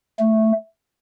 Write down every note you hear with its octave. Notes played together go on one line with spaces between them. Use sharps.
A3